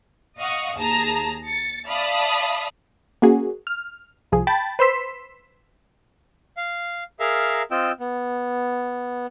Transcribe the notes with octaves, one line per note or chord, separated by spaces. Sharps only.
D#5 F5 F#5 C#6 D#6
D#2 G#4 A5 A#5
A6 C#7
D5 E5 F5 A5 B5 D#6
A#3 C#4 F#4 G#4
F6
C2 F3 G#4
G5 A5 B5 A6
B4 C5 C6 E6 B6
F5
G#4 A#4 E5 F5 A#5
C4 F4 D#5 G5 E6
B3